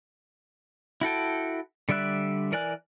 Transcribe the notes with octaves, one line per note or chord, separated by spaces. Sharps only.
E4 F#4 A4 G5
D3 G3 D5 E5 F#6
E3 A#4 D5 G#5 F#6